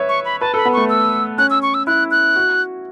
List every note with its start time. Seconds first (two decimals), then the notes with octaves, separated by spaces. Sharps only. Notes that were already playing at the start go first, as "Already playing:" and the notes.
Already playing: B4 C#5 E5
0.09 C#6
0.25 B5
0.41 B4 A5
0.54 A4 B5
0.65 B3
0.73 A3 C#6
0.89 E6
1.38 C#4 F#6
1.50 E6
1.62 C#6
1.74 E6
1.87 E4 F#6
2.11 F#6
2.36 F#4